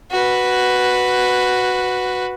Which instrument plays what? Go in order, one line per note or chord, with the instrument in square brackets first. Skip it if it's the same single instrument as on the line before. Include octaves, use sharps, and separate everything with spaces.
[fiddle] F#4 B4